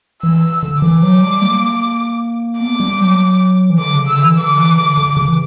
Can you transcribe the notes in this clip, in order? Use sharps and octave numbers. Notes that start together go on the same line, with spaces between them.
E3 E6
D3
E3 D6
F#3
G3
A#3
B3 D6
G3
F#3
E3
D3 D6
C#3
D3 E6
E3
D3 D6
E3
D3
D3
C#3
E3